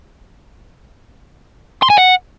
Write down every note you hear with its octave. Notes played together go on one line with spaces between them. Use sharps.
C6
G#5
F#5